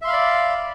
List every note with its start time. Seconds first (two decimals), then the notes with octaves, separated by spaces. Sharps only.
0.02 E5
0.04 C6
0.07 F5
0.10 B5
0.13 D5